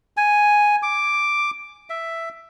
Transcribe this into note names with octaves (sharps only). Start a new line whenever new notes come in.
G#5
D6
E5